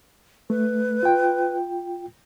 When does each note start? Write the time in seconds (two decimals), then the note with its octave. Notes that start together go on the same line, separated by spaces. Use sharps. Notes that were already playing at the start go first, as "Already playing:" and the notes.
0.50 A3 B4
1.03 F4 G5